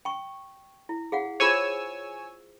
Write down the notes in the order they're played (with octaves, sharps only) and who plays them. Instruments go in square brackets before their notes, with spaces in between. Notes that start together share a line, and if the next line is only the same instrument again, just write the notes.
[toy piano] G5 C#6
E4
G#4 F5 F#5
[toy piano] F4 G#4 C5 [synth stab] C#5 G#5 E6